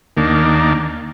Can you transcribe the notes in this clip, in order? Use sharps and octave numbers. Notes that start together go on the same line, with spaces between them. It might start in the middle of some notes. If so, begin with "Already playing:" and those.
D#2 D#3 A#3 D4